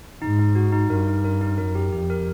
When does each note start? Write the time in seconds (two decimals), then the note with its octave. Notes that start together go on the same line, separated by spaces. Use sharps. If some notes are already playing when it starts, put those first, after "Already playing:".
0.22 G#2 D#4
0.39 D#4
0.55 F#4
0.73 D#4
0.90 G2 A#4
1.07 D#4
1.25 A#4
1.41 D#4
1.58 F#2 A#4
1.75 G4
1.92 F2 G4
2.10 A#4